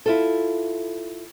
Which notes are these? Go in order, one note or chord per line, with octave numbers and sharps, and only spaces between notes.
E4 F4 A4